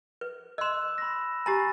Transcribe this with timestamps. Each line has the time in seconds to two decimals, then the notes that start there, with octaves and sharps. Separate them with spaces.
0.21 B4
0.58 D#5 C6 E6 F#6 E7
0.98 B5 A#6
1.46 G4 G#5 A#5 B5 A6